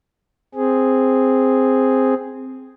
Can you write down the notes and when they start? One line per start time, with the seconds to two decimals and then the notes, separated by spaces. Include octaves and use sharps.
0.55 C4 G#4